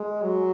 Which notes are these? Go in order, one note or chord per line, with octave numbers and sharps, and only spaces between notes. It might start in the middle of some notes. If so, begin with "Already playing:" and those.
Already playing: G#3
F#3